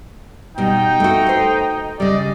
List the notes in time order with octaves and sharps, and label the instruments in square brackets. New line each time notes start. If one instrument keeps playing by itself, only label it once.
[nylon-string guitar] B2 G3 [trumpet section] D#4 G5
[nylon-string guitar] A3 F#4
C5
[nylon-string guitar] C#3 G3 [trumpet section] D5 D#5